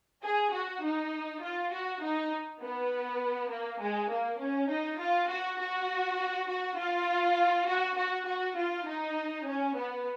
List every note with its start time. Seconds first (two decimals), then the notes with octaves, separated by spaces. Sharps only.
0.23 G#4
0.53 F#4
0.83 D#4
1.43 F4
1.72 F#4
2.02 D#4
2.62 B3
3.51 A#3
3.80 G#3
4.10 A#3
4.40 C#4
4.69 D#4
4.99 F4
5.29 F#4
5.59 F#4
6.49 F#4
6.78 F4
7.67 F#4
7.97 F#4
8.27 F#4
8.56 F4
8.86 D#4
9.46 C#4
9.75 B3